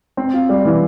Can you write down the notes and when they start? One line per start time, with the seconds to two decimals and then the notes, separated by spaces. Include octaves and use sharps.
0.17 C4
0.33 F4
0.49 G3
0.65 E3